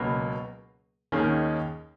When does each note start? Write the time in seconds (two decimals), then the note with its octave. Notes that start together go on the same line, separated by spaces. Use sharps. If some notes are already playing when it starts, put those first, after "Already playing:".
Already playing: C#2 B2 F#3 A#3
1.12 D#2 D#3 A#3 C#4 G#4